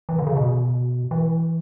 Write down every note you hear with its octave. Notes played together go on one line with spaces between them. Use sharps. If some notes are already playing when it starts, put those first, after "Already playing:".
E3
D3
C#3
B2
E3